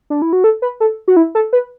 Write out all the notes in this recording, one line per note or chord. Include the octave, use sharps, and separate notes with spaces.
D4
E4
F#4
A4
B4
A4
F#4
E4
A4
B4